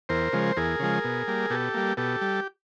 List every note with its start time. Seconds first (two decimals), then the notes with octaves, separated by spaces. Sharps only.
0.09 E2 A#4 C5
0.33 C#3 F3 G#3
0.57 E2 G#4 A#4
0.80 C#3 F3 G#3
1.04 B2
1.28 G3 A#3
1.50 B2 G4 A4
1.74 G3 A#3
1.97 B2 G4 A4
2.21 G3